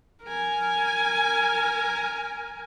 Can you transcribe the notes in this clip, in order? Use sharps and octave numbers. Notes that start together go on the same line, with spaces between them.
A#4 G#5